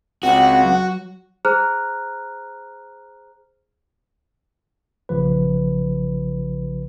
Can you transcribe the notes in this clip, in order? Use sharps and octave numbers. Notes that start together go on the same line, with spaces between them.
C#2 C4 F#4 F#5
F#3
G#4 C5 A#5 F6 F#6
A#1 C#3 F3 B4